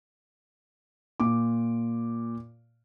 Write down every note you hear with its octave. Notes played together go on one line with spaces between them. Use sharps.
A#2 D6